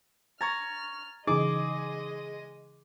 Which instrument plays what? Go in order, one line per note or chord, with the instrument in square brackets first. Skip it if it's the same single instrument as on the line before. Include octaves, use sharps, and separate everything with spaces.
[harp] A#5 [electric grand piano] C#6 G#6 A6 [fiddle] F6
[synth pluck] C#3 E3 D#4 [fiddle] G#3 D#5 [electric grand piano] G#4 [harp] D6